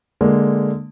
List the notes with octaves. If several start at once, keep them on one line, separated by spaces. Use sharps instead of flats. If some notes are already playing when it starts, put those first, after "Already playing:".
D3 G#3 A#3